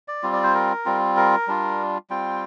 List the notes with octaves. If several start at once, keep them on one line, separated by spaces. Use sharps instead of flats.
D5
G3 C4 F4
D5
C5
A#4
G3 C4 F4
A#4
G3 D4 F4
G3 C4 F4 G5